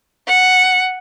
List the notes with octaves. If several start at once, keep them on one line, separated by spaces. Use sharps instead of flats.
F#5